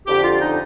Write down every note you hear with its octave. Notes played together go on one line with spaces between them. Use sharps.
F2 D3 G4
F4
D#4